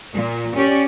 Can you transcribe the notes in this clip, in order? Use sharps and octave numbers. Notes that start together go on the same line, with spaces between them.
A#2
C#4 G4 D5